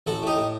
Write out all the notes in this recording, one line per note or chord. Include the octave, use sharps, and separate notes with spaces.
A1 F#4 A4
A2 D#4 G4
A2